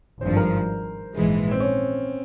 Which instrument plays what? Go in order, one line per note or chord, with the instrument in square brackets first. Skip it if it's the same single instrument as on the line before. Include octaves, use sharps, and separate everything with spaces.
[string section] G#1 G2 F3 [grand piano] C5
[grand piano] A#4
[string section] A#1 G#2 E3 G#3
[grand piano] C4
C#4